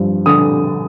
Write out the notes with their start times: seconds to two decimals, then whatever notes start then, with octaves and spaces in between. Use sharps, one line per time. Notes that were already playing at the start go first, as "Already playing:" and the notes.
Already playing: G2 F3
0.26 D3 D#6